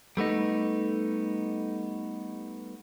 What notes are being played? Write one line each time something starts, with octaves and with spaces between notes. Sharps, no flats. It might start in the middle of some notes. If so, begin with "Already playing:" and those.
G3 A3 B3 D#4